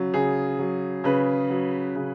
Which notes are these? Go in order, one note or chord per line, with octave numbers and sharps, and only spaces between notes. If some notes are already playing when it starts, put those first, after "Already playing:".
Already playing: C#3 F#3
C#3 G#4
F#3
C#3 B4
F#3
C#3